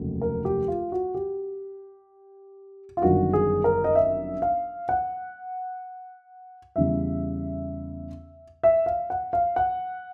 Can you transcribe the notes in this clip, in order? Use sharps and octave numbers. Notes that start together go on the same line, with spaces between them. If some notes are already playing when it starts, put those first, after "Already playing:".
Already playing: F1 D#2 C#3 F#3
A#4
G4
F4
F#4
G4
F4
G1 F#2 D#3 F#4
G#4
A#4
D#5
E5
F5
F#5
E2 C#3 E3 G3 E5
E5
F5
F#5
F5
F#5